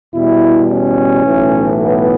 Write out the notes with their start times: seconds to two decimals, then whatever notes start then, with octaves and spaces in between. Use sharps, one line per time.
0.15 E2 B2 G3 E4
0.70 C#4
1.25 B1 A2 E3
1.80 B3